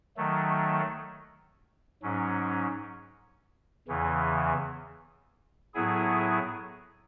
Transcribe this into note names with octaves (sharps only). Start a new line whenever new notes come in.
D#3 F#3 A3
G#2 F#3 C#4
E2 C#3 E3
A2 F#3 B3 E4 G#4